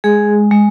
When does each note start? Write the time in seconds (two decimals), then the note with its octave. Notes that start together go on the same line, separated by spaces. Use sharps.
0.04 G#3 G#4
0.51 G#3